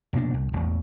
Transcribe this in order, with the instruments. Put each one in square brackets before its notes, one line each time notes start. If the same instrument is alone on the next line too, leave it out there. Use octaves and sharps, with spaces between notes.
[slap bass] F1 B2 A#3 D4
C2
E1 A1 E2 A3